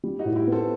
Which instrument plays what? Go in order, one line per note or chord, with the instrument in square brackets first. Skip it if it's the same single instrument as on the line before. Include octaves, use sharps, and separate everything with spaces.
[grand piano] G3
[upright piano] D#4 F#4
[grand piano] A2
[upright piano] E4 G4
[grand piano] B3
[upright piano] A4 C5